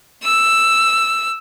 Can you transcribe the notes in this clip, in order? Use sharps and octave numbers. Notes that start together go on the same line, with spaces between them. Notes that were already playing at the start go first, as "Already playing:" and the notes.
E6